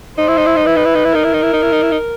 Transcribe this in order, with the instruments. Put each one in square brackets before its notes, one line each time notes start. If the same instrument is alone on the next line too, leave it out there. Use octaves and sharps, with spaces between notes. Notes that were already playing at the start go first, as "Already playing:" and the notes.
[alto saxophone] D#4 [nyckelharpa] C5
[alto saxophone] E4
D#4
E4
D#4
[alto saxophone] E4 [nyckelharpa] B4
[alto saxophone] D#4
E4
D#4
E4
[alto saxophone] D#4 [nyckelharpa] A#4
[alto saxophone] E4
D#4
E4
D#4
E4
D#4
E4
D#4